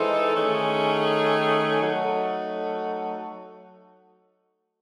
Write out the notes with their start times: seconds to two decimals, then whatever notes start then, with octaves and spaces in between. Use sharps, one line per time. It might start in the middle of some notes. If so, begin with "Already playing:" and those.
Already playing: E3 G#3 D#4 A4 C5
0.35 D#3 A3 C#4 G#4
1.81 F#3 A3 D#4 F#4 A4